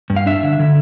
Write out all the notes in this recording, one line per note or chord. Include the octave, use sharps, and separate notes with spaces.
G2
F5
D4 E5
D3
D3